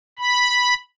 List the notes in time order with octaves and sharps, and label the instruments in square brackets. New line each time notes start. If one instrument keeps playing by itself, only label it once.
[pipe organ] B5